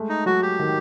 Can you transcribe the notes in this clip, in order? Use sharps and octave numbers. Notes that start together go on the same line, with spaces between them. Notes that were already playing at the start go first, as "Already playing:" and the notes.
Already playing: G#3 A3
D#4
F#3 F#4
G4
D#3